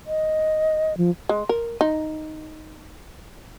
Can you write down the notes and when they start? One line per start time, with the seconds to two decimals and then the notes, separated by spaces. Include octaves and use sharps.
0.07 D#5
0.97 F3
1.29 G#3
1.49 A#4
1.81 D#4